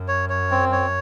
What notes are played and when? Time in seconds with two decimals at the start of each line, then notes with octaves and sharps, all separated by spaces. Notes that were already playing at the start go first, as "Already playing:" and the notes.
Already playing: F#2
0.08 C#5
0.29 C#5
0.51 C4
0.72 C#5